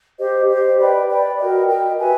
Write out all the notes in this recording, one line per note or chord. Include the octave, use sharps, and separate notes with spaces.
G4 C5 D#5
G4 C5 D#5
B4 D5 G5 B5
B4 D5 G5 B5
F#4 A#4 D#5 G5
F#4 A#4 D#5 G5
G4 B4 E5 G#5